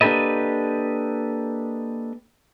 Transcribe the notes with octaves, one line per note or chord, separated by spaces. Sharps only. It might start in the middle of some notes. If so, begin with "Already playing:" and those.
A#3 D4 G4 A4 B4 D#5